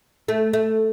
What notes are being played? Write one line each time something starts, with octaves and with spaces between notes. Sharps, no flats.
A3
A3